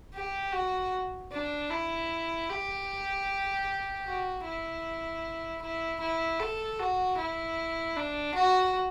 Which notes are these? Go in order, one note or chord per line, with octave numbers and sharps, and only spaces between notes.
G4
F#4
D4
E4
G4
F#4
E4
E4
E4
A4
F#4
E4
D4
F#4